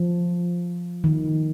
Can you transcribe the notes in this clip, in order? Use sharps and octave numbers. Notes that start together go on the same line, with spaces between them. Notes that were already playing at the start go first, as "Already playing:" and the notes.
Already playing: F3
D#3